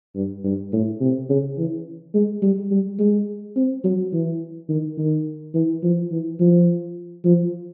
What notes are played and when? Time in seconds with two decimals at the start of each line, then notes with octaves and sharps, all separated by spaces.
0.16 G2
0.44 G2
0.73 A2
1.01 C3
1.29 C#3
1.58 E3
2.14 G#3
2.42 G3
2.71 G3
2.99 G#3
3.57 C4
3.85 F#3
4.13 E3
4.69 D#3
4.98 D#3
5.55 E3
5.84 F3
6.12 E3
6.40 F3
7.25 F3